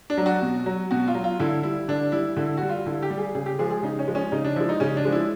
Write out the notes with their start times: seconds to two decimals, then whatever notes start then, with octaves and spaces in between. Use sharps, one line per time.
0.10 D4
0.17 F#3
0.26 F#4
0.42 B2
0.66 F#3
0.91 B2 F#4
1.08 F4
1.15 F#3
1.24 F4
1.40 D3 E4
1.63 G3 E4
1.88 D3 D4
2.12 G3 E4
2.37 D3 E4
2.57 G3 F#4
2.69 F4
2.86 D3 E4
3.03 G4
3.10 G3
3.18 G#4
3.35 C#3 G#4
3.46 G4
3.59 F3 G#3 G#4
3.71 G#4
3.83 C#3 D#4
3.99 C#4
4.08 F3 G#3
4.15 C#4
4.32 C#3 D#4
4.44 D4
4.56 F3 G#3 E4
4.69 D#4
4.80 C#3 C#4
4.97 D4
5.05 F3 G#3
5.12 E4